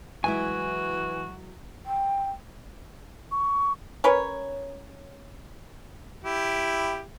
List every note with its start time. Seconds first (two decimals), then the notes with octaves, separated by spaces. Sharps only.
0.24 E3 F#3 G#3 E4 F#4 G#5
1.86 G5
3.32 C#6
4.04 C#4 A#4 B4 C#5
6.24 E4 G4